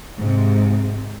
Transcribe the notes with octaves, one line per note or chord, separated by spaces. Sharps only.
G#2 C3